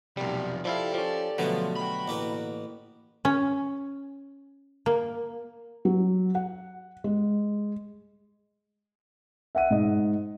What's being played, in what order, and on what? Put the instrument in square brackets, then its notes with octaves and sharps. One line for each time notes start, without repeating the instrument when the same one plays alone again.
[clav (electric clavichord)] B1 G3 [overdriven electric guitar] C3 F3 [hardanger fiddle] F4 A#4
[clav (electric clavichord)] F3 E4 F5 [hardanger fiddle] G4 A4 [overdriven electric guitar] D5
[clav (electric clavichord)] F3 C#4
[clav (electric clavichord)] B2 D3 B3 [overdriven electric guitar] F3 [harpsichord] F#3 A3
[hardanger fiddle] F#4 G5 [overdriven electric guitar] B5
[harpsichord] A1 A#3 B4
[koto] C#4
A#3
[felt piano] F#3
F#5
G#3
[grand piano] E5 F#5 D#7
G#2 D#5